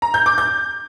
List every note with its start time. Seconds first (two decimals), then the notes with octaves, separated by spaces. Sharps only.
0.02 A#5
0.14 G6
0.26 D6
0.38 G6